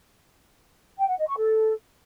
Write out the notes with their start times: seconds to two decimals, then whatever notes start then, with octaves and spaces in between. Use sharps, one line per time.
0.98 G5
1.08 F#5
1.18 D#5
1.27 C#6
1.37 A4